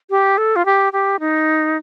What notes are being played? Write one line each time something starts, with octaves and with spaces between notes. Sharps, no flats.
G4
A4
F4
G4
G4
D#4